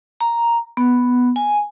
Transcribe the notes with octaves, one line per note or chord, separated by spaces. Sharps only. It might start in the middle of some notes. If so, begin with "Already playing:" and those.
A#5
B3
G#5